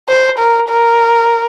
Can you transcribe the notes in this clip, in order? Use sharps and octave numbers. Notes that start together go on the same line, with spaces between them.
C5
A#4
A#4